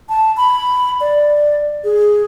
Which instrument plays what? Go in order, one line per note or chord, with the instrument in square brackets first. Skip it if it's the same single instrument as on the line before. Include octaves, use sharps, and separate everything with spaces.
[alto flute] A5
B5
D5
G#4